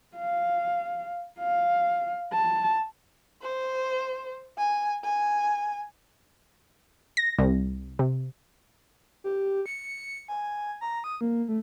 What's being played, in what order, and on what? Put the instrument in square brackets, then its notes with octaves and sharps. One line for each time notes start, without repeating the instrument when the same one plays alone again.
[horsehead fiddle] F5
F5
A5
[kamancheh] C5
G#5
G#5
[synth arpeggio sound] A#6
C2
C3
[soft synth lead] G4
C#7
G#5
A#5
D#6
A#3
A3